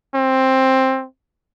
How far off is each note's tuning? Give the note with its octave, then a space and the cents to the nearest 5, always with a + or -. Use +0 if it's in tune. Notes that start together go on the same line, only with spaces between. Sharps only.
C4 +10